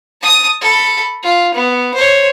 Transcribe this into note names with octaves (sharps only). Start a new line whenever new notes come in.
A5 D#6
A4 B5
F4
B3
C5 C#5